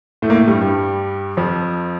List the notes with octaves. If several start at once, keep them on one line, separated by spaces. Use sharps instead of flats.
A2 A3
A#3
A2 A3
G2 G3
G2 G3
F2 F3